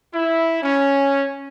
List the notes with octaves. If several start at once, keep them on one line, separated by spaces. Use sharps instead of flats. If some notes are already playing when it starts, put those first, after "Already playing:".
E4
C#4